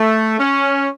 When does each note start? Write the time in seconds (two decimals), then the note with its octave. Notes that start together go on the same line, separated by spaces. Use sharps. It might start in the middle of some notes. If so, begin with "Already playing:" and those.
Already playing: A3
0.39 C#4